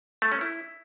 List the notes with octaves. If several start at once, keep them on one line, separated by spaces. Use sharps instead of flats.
A3
C#4
E4